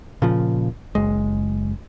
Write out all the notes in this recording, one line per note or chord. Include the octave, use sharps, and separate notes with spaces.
A#2 C#3 F3
F#1 G#3